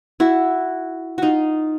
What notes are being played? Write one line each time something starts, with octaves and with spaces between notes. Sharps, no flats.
E4 F#4
D#4 F4 F#4